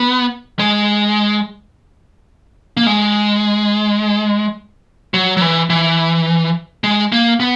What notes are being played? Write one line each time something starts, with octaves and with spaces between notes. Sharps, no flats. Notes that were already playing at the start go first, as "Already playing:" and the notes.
Already playing: B3
G#3
A#3
G#3
F#3
F#3
E3
E3
G#3
A#3
B3